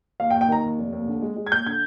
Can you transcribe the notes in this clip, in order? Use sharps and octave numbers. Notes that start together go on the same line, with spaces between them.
D#2 F5
G5
D#2
G5
D#3 A#5
D#2
F1
D#2
D3
G#3
G#3
G#6
D#2 G6
D3 G#6